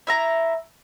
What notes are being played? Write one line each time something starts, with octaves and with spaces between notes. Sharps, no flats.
E4 E5 A#5